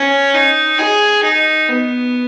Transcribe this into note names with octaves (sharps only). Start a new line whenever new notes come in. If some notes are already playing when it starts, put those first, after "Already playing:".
Already playing: C#4
D#4
G#4
D#4
B3